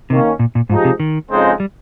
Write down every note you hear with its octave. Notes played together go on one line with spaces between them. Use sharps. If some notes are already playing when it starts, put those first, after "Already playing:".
C3 D#3 A#3 C#4
A#2
A#2
G#2 F3 G#3 D#4 G4
C3
D#3
F2 C#3 G#3 C4 D#4
G3